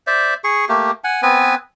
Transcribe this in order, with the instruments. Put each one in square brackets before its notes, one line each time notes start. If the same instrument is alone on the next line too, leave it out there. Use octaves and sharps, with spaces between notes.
[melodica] C5 D5 E5
G#4 C#6
A3 A#3 G4
F#5 G#5
B3 C4 B4 G#5